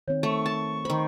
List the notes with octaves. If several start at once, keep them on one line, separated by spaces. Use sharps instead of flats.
D#3 C4 C#5
A3 C#6
A5
D#3 C5 B5